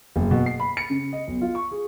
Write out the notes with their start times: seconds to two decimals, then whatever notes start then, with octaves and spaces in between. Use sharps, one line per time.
0.16 F#1
0.31 B2
0.46 C7
0.60 B5
0.77 C#7
0.90 C#3
1.13 D#5
1.28 B1
1.41 F4
1.55 C#6
1.71 G#4